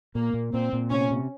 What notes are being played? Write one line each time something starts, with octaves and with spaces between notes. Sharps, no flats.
A#2 A#3
A#2
A#2 C4
A#2
C3 C#4
C3